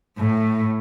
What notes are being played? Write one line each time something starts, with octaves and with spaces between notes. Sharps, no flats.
A2